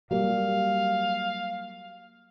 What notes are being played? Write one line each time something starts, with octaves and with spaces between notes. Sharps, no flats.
F#3 G3 A#3 F5